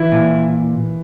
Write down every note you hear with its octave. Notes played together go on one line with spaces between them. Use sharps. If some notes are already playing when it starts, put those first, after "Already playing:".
Already playing: E3 E4
A#2